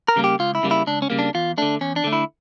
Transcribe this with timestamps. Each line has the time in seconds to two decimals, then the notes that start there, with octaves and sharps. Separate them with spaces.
0.08 A#4
0.16 C#3 G3 A#3
0.24 G4
0.39 C#2 F4
0.55 E4
0.63 C#3 G3 A#3
0.71 E4
0.87 C#2 D4
1.02 C#4
1.10 C#3 G3 A#3
1.19 D4
1.34 E2 F4
1.58 D3 A3 D4
1.81 E2 C#4
1.96 D4
2.04 D3 A3
2.13 E4